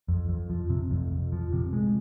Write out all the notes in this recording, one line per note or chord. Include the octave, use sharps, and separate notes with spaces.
F2
F2
F3
C3
F2
F2
F3
C3
G#3